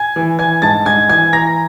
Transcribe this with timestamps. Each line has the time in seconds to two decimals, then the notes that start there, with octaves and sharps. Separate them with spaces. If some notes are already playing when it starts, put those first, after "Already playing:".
Already playing: G#5 G#6
0.16 E3
0.39 E3 G#5 G#6
0.62 G#2 A5 A6
0.86 G#2 G#5 G#6
1.09 E3 G#5 G#6
1.33 E3 A#5 A#6